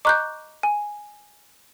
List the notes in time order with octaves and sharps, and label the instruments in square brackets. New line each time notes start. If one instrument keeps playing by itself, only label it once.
[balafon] D#5 A#5 C#6 [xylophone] D6 F#6 G6
[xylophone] G#5